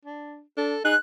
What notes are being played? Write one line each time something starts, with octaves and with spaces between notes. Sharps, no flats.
D4
D4 A4
D#4 G#4 F#6